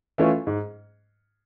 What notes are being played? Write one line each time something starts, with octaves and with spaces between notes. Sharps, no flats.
E3 A3 C#4 F4
G#2